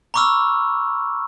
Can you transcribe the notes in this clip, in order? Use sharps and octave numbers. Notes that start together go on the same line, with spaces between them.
A#5 B5 C#6 D6 E6 F6